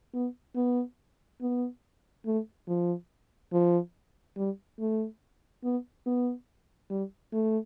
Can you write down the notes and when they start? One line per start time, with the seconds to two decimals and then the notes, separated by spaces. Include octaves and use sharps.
0.14 B3
0.56 B3
1.41 B3
2.26 A3
2.67 F3
3.52 F3
4.36 G3
4.79 A3
5.64 B3
6.06 B3
6.90 G3
7.33 A3